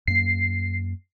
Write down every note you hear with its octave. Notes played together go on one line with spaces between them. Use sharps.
F#2 A#3 C7